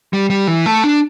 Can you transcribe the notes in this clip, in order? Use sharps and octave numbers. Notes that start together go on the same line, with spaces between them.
G3
G3
E3
A3
D4